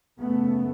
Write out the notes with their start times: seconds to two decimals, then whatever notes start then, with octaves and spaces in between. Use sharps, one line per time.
0.18 F#2 C#3 A3 B3